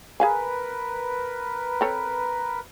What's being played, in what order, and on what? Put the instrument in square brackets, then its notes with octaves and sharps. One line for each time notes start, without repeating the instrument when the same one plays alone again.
[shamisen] G#4 F5 G#5 [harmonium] A#4 B4
[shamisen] C4 A4 C#5